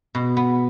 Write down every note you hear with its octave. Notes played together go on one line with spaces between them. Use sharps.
B2
B3